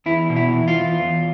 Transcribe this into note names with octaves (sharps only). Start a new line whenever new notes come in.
E2 E4
B2
E4
E2
F4
E2
E2